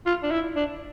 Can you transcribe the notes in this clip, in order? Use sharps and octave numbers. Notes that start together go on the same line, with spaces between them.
F4
D4
E4
D4